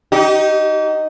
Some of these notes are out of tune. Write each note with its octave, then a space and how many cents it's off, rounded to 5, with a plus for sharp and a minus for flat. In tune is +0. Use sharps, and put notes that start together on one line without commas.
D#4 +0 G4 -40